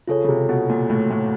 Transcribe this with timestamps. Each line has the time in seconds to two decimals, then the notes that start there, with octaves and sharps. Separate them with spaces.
0.08 C#3 F4 A4 C#5
0.24 C#3
0.29 C3
0.49 B2
0.70 A#2
0.90 A2
1.10 A2